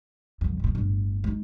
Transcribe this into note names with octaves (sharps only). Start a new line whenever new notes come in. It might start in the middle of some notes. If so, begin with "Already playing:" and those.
C2 F2
F#2 A2
G1 A2
G#3 D#4